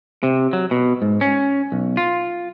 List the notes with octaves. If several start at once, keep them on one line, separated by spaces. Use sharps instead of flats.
C3
F#3
B2
G#2
C#4
B1
F4